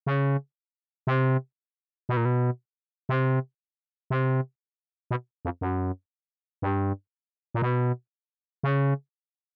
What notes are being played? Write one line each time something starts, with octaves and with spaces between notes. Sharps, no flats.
C#3
C3
B2
A#2
B2
C3
C3
B2
F2
F#2
G2
A#2
B2
C#3